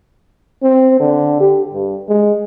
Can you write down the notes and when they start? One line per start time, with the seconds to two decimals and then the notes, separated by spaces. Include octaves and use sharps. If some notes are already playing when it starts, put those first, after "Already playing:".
0.63 C4
1.00 D3
1.40 G4
1.74 G2
2.09 G#3